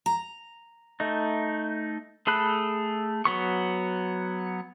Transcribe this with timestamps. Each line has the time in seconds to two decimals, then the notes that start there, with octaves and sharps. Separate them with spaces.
0.06 A#5
1.00 A3 D#4
2.27 A3 G#4 A4 B5 F#6
3.25 F#3 B3 C#6